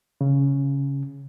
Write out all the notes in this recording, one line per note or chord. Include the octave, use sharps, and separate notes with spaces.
C#3